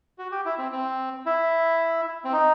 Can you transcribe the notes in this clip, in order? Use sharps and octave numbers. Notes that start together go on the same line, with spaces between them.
F#4
G4
E4
C4
C4
E4
C4
D#4